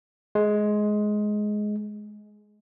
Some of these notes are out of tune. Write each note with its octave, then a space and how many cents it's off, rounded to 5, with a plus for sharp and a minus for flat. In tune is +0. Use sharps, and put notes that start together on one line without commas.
G#3 +15